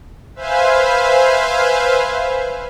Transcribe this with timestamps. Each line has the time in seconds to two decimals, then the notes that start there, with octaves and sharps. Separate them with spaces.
0.35 B4 C5 E5 F5 G#5